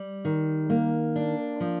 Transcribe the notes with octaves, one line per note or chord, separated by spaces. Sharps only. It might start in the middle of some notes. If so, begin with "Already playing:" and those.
Already playing: G3
D#3
A#3
D4
F3